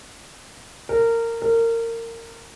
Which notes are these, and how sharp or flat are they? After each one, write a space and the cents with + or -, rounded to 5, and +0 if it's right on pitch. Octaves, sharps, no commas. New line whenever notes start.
A#4 -20
A#4 -25